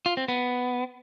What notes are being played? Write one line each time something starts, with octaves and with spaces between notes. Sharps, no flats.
F4
C4
B3